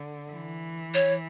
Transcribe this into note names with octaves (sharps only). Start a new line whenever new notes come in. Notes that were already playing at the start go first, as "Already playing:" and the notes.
Already playing: D3
E3
C#5